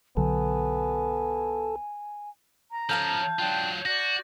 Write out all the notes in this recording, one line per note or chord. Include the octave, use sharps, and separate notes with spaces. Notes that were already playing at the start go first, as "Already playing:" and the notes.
B1 D3 F#3 B3 A4 G#5
A#5
F3 C#4 A4 F5 A5 G6
F#3 D4 F4 G5 F#6
F#4 D5 A#6